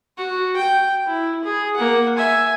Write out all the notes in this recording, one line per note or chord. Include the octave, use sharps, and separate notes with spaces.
F#4
G5
E4
G#4
A#3 F#5
E5 G#5